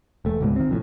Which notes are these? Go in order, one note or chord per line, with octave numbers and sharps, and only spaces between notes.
E1 A3
C#2 G#2 B2
D#3 C4
F1 F2 A2